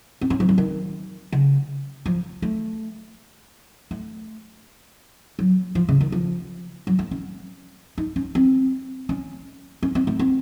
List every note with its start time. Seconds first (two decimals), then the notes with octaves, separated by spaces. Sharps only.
0.21 C4
0.30 C#4
0.40 F3
0.49 F#3
0.58 D#3
1.32 C#3
2.06 F3
2.42 A3
3.91 A3
5.39 F#3
5.75 F3
5.89 C#3
6.01 D#3
6.12 F3
6.87 F#3
6.99 A3
7.11 C#4
7.98 D#4
8.16 C#4
8.35 C4
9.09 C#4
9.83 C#4
9.95 C4
10.07 A3
10.19 C4